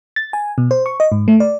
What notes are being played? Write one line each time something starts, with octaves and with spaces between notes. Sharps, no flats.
A6
G#5
B2
C5
C#6
D#5
G#2
A3
D5